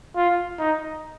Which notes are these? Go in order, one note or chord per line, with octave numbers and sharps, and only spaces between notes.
F4
D#4